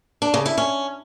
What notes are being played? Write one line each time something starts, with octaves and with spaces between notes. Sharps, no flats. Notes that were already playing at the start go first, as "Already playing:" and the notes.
D4
C#3
E4
C#4